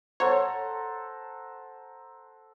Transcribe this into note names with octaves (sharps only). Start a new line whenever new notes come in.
A4 C5 C#5 F#5 A#5 C6